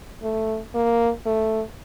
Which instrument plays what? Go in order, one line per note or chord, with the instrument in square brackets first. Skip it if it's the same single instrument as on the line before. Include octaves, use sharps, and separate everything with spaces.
[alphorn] A3
A#3
A3